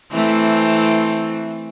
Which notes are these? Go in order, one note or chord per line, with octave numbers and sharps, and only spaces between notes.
E3 A3 C4